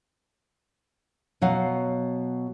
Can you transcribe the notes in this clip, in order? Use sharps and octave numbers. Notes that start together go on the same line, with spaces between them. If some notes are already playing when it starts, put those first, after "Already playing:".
B2 F#3 F5 F#5